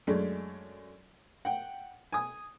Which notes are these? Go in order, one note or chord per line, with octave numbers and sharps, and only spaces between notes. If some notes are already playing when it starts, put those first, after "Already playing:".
F#2 G#3 A3 D4
F#5 G5
G#5 D#6